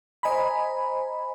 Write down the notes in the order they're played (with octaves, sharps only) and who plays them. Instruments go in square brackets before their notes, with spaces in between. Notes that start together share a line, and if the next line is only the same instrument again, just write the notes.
[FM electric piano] C5 D#5 G#5 A#5 B5